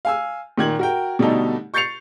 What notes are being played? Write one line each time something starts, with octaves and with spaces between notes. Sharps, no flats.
F5 G#5 E6
A#2 D#3 G#6 F#7
F#4 A#4 G5
B2 D3 G3 A3 D#4 A4
C#6 G6 A6 C7 C#7 F7